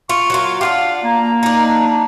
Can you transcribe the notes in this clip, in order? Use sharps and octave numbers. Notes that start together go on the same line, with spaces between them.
F4 C#6
F#3 A#3 F4
D4 F4 G4 F5 F#5
A#3 A#5
D4 D#4